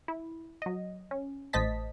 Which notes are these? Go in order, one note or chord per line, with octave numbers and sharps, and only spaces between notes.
E4
F#3 D#5
C#4
A1 A2 C5 D#5 A5 B6